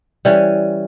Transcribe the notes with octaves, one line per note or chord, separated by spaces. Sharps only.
E3 G3 C#4